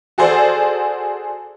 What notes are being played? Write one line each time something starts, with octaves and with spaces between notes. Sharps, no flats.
F#4 G#4 A4 C5 D5